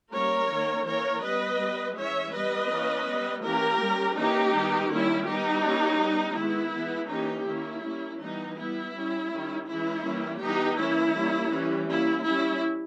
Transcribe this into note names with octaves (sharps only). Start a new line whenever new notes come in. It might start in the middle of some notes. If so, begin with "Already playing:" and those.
G3 A#3 C#4 A#4 C#5
D#3 A#3 C#4
E3 A#3 C#4 A#4 C#5
G3 B3 B4 D#5
G3 B3
E3 G#3 C#4 C#5 E5
G3 B3 B4 D#5
E3 A#3 C#4
G3 B3
E3 A#3 C#4 G4 A#4
G3 C#4
E3 A#3 C#4 D#4 G4
D#3 G3 B3
D#3 G3 A#3 C#4 E4
G3 B3 D#4 G4
G3 A#3 C#4
G3 B3
D#3 G#3 B3 E4
E3 G#3 B3
E3 A#3 C#4 D#4 G4
D#3 A#3 C#4 E4
G3 A#3 C#4
E3 G3 B3 D#4
G3 B3 E4
G3 C#4
D#3 G3 C#4
E3 G#3 C#4 E4
E3 G3 A#3 C#4
E3 G3 B3 D#4 G4
E3 A#3 C#4 E4
G3 A#3 C#4
E3 G3 C#4
G3 A#3 C#4 E4
G3 C#4 E4